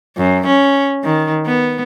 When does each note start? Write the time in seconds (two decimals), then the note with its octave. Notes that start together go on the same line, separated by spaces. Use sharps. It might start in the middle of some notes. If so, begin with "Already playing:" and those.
0.17 F#2
0.47 C#4
1.03 D#3
1.46 B3